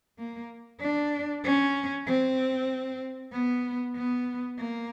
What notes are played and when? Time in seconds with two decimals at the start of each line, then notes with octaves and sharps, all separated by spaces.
0.19 A#3
0.81 D4
1.44 C#4
2.07 C4
3.32 B3
3.95 B3
4.58 A#3